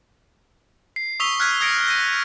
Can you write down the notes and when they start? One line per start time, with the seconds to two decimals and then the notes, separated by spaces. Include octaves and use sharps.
0.96 C7
1.20 C#6 D#6 E6 B6 F7 G7
1.40 F6 F#6 G#6 B6
1.60 D#6 E6 G#6 A#6 C#7 D7
1.86 G6 A#6 D#7